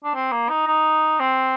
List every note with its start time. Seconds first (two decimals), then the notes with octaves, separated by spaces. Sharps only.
0.04 D4
0.15 C4
0.32 A#3
0.50 D#4
0.67 D#4
1.20 C4